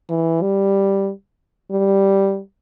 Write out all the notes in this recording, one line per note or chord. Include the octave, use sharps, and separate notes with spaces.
E3
G3
G3